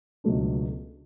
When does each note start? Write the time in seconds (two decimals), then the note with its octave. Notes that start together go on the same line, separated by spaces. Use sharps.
0.24 C#2 B2 F#3 A3 D4